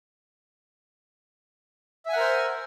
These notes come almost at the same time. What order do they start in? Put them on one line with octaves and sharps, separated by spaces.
E5 G#5 F#5 A#4 C5